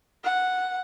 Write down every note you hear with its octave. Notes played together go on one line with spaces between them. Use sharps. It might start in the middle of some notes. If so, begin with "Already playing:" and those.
F#5